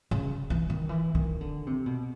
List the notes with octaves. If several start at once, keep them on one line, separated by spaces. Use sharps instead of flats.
C#3
E3
D#3
E3
D#3
D3
C3
B2